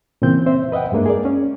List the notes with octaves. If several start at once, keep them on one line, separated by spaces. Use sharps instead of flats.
A#2 C#3 E3 C4 G6
C4 C5 E5
B4 D#5 E5 F#5 G5
G2 G#3 A#3 D4
G#4 A#4 D5
C#4